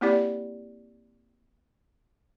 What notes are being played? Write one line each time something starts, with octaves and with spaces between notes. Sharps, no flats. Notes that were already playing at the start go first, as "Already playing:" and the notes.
A#3 C4 E4 G4 D5